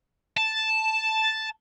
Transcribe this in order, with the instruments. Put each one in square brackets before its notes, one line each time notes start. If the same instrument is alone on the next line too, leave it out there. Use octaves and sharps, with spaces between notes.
[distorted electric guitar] A5